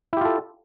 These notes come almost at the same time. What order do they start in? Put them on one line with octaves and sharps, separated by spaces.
E4 G4 F4 A4